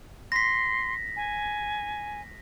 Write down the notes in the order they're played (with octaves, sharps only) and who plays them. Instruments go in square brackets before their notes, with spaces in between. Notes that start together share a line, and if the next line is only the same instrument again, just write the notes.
[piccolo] C6 [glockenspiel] A#6 B6
[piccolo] G#5